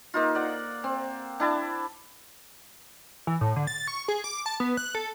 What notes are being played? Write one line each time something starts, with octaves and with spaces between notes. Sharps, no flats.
A#3 D#4 F4
D5 F#5
C4
D4 E4 A5
E3
A2
D3
A6
C#6
G#4
D6
A5
B3
F#6
A4